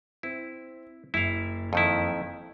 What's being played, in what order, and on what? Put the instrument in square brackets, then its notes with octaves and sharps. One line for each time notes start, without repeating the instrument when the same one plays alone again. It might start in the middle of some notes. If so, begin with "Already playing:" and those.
[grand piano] C4 [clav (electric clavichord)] E4
[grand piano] F#1 [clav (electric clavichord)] E4 F5
[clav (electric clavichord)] F2 D#3 E4